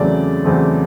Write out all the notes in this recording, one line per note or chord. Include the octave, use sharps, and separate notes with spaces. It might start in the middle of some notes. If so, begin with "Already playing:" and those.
Already playing: E2 C#3 F#3 A3 C4 D5
E2 C#3 F#3 A3 C4